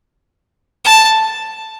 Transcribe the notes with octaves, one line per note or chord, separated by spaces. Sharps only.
A5